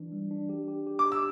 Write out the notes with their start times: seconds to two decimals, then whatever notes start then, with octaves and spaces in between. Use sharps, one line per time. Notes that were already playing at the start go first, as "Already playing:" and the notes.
Already playing: E3 D4
0.12 G3
0.31 D4
0.49 G4
0.68 G4
0.87 G4
0.99 D6
1.06 G4
1.12 E6